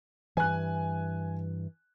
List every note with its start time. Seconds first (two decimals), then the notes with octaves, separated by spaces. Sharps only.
0.37 G2 E3 G#5 F#6